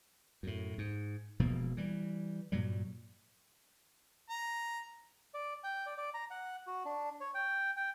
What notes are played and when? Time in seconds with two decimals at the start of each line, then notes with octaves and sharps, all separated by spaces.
0.43 F#2 A2
0.78 G#2
1.39 E1 B2 F3 A#3
1.77 E3 G3
2.52 G2 A#2 F#3 G3
4.30 A#5
5.34 D5
5.64 G5
5.86 D5
5.98 D5
6.14 A#5
6.31 F#5
6.67 F#4
6.85 D4
7.21 C#5
7.34 G5
7.76 G5